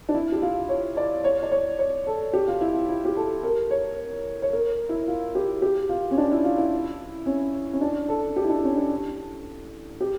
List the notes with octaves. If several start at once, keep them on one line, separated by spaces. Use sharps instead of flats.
D4
E4
G4
F4
C#5
D5
C#5
D5
C#5
C#5
A4
G4
F4
E4
F4
E4
G4
A4
A#4
C#5
C#5
A#4
E4
F4
G4
G4
F4
C#4
D4
E4
F4
E4
C#4
C#4
D4
A4
G4
E4
D4
C#4
D4
G4